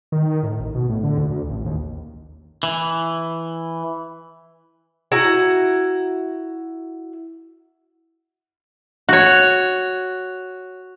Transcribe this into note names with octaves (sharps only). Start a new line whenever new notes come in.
D#3
A2
A1
B2
A2
D3
D2
D2
A1
D#2
E3
E4 F#4 A#5
F#4 C#5